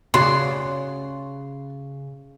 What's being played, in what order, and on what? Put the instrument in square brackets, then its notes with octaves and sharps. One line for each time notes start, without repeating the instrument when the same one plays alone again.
[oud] C#3 F#4 D5 [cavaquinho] C6